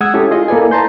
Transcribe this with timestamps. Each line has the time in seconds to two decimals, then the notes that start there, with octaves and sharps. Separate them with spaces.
0.01 G#3 F#5 D#6 E6 G#6
0.14 C#4 E4 G4 A4
0.31 F4 G#4 D#5
0.48 A#3 E4 A4 B4 D5 G#5
0.71 B4 A5 A#5 C6 G6